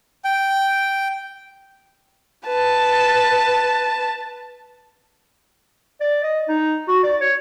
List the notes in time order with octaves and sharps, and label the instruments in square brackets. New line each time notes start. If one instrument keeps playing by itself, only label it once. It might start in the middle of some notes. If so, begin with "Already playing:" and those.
[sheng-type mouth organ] G5
[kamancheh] B4 A5
[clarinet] D5
D#5
D#4
F#4
D5
C#5